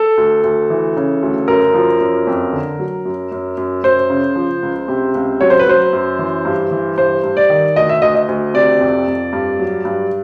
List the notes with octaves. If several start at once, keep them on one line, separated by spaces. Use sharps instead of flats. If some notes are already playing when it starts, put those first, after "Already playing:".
Already playing: A4
D2
D2
E3
C#3
D2
F#2 A#4
F3
F#2
F2
D3
F#3
F#2
F#2
F#2
F#2 C5
C#3
F3
C#2
C3
C#2
F#3 C#5
C5
B4
F#3 C5
F#2
E3
G2
E3
G2 C5
G2
D5
D#3
D2 D#5
E5
D2 D#5
D#5
D2
C3 D5
F2
F2
G2
F#3
G2